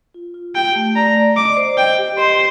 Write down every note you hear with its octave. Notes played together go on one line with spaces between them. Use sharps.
F4
F4
G4 G5
A3
D5 A#5
D5
D#5 D6
C5
D#5 G5
G4
C5 D#5